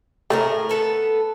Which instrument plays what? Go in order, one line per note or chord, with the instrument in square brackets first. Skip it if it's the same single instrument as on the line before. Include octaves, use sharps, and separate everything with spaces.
[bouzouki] A2 G#4 A#4 [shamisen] A3
[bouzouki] B3 A4 B4